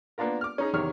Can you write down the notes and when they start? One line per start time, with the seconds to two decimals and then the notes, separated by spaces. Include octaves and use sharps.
0.18 A#3 B3 D4 F4 A#4
0.41 D6 F6
0.58 C#4 D#4 G#4
0.73 E2 C3 D#3 C#5 F6